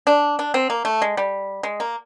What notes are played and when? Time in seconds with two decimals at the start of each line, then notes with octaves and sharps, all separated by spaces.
0.07 D4
0.39 D4
0.54 C4
0.70 A#3
0.85 A3
1.02 G#3
1.17 G3
1.63 G#3
1.80 A#3